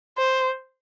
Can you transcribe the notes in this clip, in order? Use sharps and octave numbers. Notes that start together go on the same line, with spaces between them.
C5